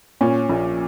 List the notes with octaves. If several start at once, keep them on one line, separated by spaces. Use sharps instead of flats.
A#2 C#4
A#1